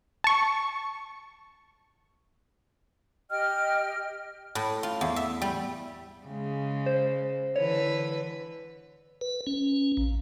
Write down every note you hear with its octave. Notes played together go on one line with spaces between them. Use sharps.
A5 C#6
G4 D#5 G5 F6
A2
F4
E2
E5
G3
C#3 G#3
C5
D3 E3 B4 C#5
B4
C#4
A#1